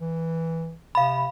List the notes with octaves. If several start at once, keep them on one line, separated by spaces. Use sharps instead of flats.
E3
C3 F5 B5